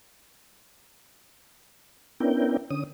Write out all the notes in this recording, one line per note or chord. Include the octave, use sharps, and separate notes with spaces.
B3 C#4 D4 E4 A#4 G5
D3 C#4 D#6